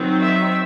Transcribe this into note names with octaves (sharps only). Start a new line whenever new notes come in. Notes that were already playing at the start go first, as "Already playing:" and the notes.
Already playing: D#3 F#3 C4 D#4
E5